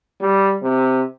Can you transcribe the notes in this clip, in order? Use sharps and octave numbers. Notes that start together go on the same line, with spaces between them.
G3
C3